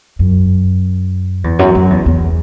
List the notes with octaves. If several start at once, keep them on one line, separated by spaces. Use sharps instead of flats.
F#2
E2
F#2
F#2
E2
E2